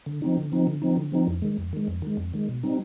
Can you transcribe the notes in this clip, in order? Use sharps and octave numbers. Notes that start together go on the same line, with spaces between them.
D3
F3 C4 D#4
D3
F3 C4 D#4
D3
F3 C4 D#4
D3
F3 C4 D#4
F2
D#3 G#3
F2
D#3 G#3
F2
D#3 G#3
F2
D#3 G#3
B2
G3 C4 D#4